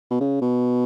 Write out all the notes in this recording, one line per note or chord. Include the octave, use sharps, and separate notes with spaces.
B2
C#3
B2